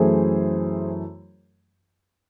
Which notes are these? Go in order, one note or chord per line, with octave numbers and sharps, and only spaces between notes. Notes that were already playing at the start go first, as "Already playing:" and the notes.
Already playing: F#2 E3 A3 G#4 C5